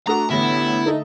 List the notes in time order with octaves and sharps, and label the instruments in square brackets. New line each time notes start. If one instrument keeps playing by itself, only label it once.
[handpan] A3 [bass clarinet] D4 [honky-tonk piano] F#4 A4 D#6 [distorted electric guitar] A#5
[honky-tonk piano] A1 A#6 E7 [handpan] D3 [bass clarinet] B3 [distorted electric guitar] E4
[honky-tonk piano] A3 A4 D#5 [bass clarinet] D#4